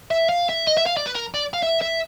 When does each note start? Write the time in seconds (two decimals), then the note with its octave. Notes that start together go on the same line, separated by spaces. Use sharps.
0.11 E5
0.29 F5
0.49 E5
0.67 D#5
0.77 E5
0.86 F5
0.97 D5
1.06 B4
1.15 A#4
1.34 D5
1.54 F5
1.63 E5
1.82 E5